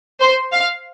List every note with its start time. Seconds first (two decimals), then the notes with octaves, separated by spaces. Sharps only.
0.21 C5
0.52 F5